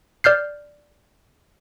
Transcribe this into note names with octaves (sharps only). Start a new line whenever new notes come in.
D5 F6 G6 C7